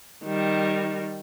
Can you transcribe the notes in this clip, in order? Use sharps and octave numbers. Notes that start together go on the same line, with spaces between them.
D#3 G3